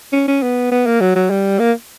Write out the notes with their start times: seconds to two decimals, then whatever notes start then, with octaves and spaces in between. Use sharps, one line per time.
0.13 C#4
0.28 C#4
0.42 B3
0.71 B3
0.86 A#3
1.01 F#3
1.15 F#3
1.30 G3
1.59 A#3